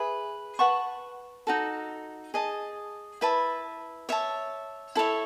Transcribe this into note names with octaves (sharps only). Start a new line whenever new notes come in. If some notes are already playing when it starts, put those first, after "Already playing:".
Already playing: G#4 B4 E5 B5
B4 F#5 A5 C#6
D#4 F#4 A4
G#4 D#5 A5
E4 B4 E5 A5
C#5 E5 A5
E4 A4 C#5 E5